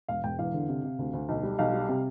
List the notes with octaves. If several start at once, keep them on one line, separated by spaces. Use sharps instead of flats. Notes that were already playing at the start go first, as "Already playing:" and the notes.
E1 F5
E1 G5
E2 F5
D3
C3
C3
D2
D2
B1
G3
B1 F5
G3
C3